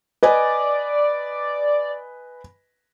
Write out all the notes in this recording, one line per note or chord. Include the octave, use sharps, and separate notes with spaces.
B4 D5 D#5 G#5